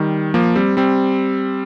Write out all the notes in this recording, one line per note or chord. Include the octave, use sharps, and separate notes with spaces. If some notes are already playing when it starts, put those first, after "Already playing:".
Already playing: D#3 G3
F3 A#3
G3 C4
G3 C4